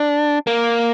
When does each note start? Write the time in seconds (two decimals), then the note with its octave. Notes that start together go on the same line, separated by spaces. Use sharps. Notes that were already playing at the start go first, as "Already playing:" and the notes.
Already playing: D4
0.47 A#3